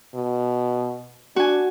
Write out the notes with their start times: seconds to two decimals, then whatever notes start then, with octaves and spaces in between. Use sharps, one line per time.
0.15 B2
1.36 D4 F#4 G#5